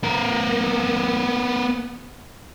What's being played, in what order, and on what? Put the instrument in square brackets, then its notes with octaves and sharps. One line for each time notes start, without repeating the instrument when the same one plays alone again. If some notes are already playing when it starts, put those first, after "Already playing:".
[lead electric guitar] B3 A#4